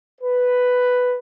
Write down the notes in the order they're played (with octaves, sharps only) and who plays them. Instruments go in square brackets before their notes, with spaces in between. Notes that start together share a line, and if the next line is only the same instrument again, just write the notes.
[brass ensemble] B4